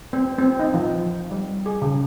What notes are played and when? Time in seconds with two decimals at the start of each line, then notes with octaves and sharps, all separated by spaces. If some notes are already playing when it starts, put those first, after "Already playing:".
0.13 C4
0.39 C4
0.59 D#4
0.74 F3
1.31 G3
1.66 G#4
1.82 C#3